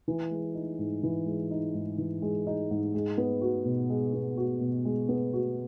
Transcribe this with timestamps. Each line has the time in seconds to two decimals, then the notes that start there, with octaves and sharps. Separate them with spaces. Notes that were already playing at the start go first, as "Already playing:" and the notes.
0.08 E3
0.31 G#3
0.55 D#4
0.79 G#2
1.03 E3
1.26 G#3
1.51 D#4
1.74 G#2
1.98 E3
2.22 G#3
2.47 D#4
2.71 G#2
2.94 G#3
3.18 B3
3.41 F#4
3.65 B2
3.90 G#3
4.13 B3
4.37 F#4
4.61 B2
4.85 G#3
5.09 B3
5.33 F#4